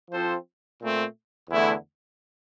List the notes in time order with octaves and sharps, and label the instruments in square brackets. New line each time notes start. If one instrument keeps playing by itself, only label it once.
[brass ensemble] F3 C4 F4 A4 C5
A#2 A3 C4
E2 D3 A3 E4